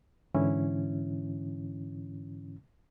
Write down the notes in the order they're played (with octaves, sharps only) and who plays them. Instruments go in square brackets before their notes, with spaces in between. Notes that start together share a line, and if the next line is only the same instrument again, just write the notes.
[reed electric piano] G#2 D3 E3 C#4 E4